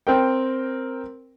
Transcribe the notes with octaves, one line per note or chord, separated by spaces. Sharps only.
C4 A#4 G5